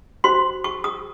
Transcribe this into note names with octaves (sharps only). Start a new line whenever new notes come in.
F#4 C5 C6
C#6
D#6